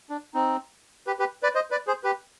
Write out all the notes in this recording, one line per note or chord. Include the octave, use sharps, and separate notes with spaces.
D4
C4 D#4
G4 B4
G4 B4
B4 D5
C5 D#5
B4 D5
G#4 C5
G4 B4